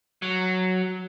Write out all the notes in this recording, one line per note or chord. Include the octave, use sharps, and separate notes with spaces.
F#3